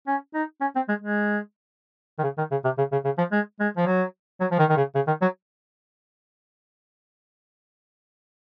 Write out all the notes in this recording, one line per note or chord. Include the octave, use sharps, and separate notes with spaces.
C#4
D#4
C#4
C4
G#3
G#3
D#3
C#3
D#3
C#3
C3
C#3
C#3
C#3
F3
G#3
G#3
F3
F#3
F#3
F3
D#3
D#3
C#3
C#3
D#3
F#3